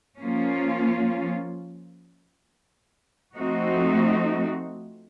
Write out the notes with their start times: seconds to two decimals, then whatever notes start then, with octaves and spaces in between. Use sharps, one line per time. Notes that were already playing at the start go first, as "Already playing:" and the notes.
0.19 F3 A#3 C#4 F4
3.34 F3 A3 C4 D#4 F#4